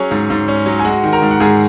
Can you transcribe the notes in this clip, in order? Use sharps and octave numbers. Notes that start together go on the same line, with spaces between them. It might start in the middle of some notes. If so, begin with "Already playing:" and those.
Already playing: F#3 C#4 G#4 G#5
G#2
G#2
C#4
F#3
G#5
G#3 F#4 F#5
D#3
A#4 A#5
G#2
F#5
G#2 G#4 G#5